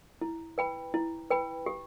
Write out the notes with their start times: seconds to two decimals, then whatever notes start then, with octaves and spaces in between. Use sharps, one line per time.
0.21 E4
0.58 B4 G5 B5
0.94 E4
1.30 B4 G5 B5
1.66 G4